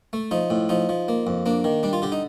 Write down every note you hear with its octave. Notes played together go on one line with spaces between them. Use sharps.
A3
F3 D#4
A2
F3 D#4
F3
A#3
F2
A#3 D4
D#3
G3 D4
F4
D3 G4
D#4